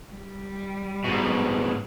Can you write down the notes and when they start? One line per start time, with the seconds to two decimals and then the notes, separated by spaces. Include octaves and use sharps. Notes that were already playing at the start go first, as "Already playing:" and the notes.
0.12 G3
1.05 G#2 B2